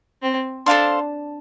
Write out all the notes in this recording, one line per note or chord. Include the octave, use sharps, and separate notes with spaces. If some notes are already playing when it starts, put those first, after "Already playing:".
C4
D4 A4 C5 F5 C6